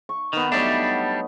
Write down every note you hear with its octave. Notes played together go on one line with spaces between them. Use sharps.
C#6
D#3 B3 D#4
F#3 G3 A3 D4